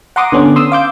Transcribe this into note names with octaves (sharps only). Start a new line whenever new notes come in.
F#5 A#5 C6 D6 D#6
D3 B3 C#4 D4
C6 D#6 E6
F5 D6 G6